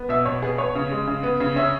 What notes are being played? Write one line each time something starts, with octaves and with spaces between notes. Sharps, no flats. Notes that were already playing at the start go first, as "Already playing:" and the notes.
Already playing: B3
B2 E5
B2 C#5
B3 G#4
B3 C#5
C#3
G#3
C#3
B3
C#3
C#4 E5